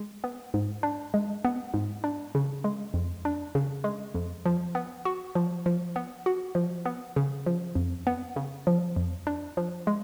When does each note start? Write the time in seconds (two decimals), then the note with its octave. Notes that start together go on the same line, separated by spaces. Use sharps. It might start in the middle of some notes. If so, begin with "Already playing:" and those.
Already playing: G#3
0.24 B3
0.54 G#2
0.83 D4
1.14 G#3
1.45 B3
1.74 G#2
2.04 D4
2.35 C#3
2.64 G#3
2.94 F2
3.25 D4
3.55 C#3
3.84 G#3
4.14 F2
4.45 F3
4.75 B3
5.05 F#4
5.35 F3
5.66 F3
5.96 B3
6.26 F#4
6.55 F3
6.86 B3
7.16 C#3
7.46 F3
7.75 F2
8.07 B3
8.36 C#3
8.67 F3
8.96 F2
9.27 D4
9.57 F3
9.87 G#3